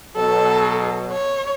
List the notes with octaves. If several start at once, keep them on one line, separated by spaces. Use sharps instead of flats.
B2 F#3 A4
C#5